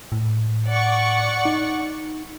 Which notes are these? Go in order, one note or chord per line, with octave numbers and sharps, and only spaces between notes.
A2
D5 F#5 C#6
D#4